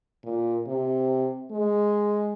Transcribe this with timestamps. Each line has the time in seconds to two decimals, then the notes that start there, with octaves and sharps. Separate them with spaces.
0.24 A#2
0.67 C3
1.51 G#3